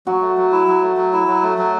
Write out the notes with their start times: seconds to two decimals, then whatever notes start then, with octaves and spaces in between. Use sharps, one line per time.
0.06 F#3 F#4
0.22 A3
0.37 F#3
0.52 E4
0.67 F#3
0.82 A3
0.97 F#3
1.13 E4
1.28 F#3
1.43 A3
1.58 F#3